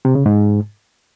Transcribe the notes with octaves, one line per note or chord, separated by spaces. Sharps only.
C3
C#3
G#2